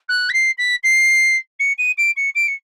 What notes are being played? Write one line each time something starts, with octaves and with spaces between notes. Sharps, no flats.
F#6
B6
C7
B6
C7
C#7
D#7
D7
C#7
D7
C#7